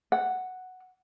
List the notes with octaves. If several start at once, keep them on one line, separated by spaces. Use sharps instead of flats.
F#5